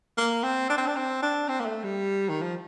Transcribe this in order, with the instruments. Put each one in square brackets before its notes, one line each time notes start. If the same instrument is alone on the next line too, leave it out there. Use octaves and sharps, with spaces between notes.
[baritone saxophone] A#3
C4
D4
C4
D4
C4
D4
C4
A#3
A3
G3
D#3
F3